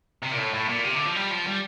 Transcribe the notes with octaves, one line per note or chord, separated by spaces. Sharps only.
C3
A#2
A2
A2
A#2
C3
D3
F3
G3
F3
G3